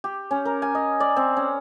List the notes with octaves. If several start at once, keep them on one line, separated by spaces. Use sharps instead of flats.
G4
C#4
A#4
G#5
D#5
D5
C4
C#4